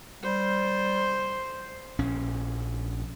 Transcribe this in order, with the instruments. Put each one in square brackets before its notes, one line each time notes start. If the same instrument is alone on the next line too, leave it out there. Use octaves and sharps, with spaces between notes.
[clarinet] G3 [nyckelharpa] C5
[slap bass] A#1 C#4